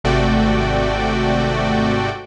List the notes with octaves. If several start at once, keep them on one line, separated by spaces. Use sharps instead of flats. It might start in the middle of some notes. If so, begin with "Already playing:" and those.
G#1 C3 A3 F#4 D5 G5